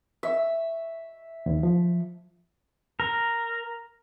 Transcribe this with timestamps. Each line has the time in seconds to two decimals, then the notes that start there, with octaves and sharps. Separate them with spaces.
0.23 E5
1.46 D#2
1.63 F3
3.00 A#4